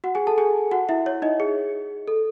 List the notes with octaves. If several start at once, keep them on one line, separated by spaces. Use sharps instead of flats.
F#4 F#5
G#4 G#5
A4 A5
G#4 G#5
F#4 F#5
E4 E5
C#5
D#4 D#5
G#4
A4